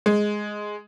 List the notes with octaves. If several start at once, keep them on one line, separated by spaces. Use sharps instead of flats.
G#3